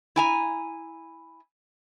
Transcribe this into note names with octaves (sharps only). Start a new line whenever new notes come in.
E4 G#5 A#5